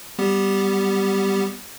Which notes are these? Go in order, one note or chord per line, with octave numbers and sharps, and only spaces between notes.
G3 B3 G4